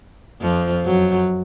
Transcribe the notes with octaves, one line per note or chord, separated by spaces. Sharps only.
F2 F3
F#2 F#3